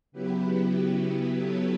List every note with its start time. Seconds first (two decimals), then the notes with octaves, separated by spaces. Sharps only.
0.12 C#3 F#3 B3 E4 G4 B4
1.36 A4 C#5